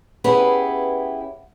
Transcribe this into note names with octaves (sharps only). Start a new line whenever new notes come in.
B3 C#4 E4 G4 G#4 B4